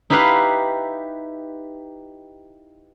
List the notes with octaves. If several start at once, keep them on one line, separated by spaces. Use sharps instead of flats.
D#4 E4 G4 B4 F5 F#5